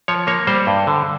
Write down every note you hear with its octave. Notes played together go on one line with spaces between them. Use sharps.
F3 C#5
A#3 C#5
G3 C5
G2
D3